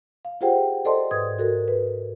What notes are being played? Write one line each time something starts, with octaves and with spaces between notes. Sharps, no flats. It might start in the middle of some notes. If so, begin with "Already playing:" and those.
F5
F4 G4 G#4 C5 F#5 G5
A4 C5 D5 D#5 A5 C6
G#2 B4 D#6 G#6
F#4 A4 A#4
B4